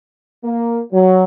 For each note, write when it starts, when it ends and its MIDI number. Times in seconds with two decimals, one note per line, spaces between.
0.44 0.80 58
0.92 1.24 54